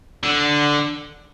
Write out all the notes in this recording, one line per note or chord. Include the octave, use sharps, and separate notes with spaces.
D3